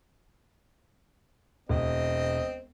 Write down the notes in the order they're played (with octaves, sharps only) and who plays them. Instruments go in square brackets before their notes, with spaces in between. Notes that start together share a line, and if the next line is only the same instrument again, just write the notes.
[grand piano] E1 [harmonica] C4 D#5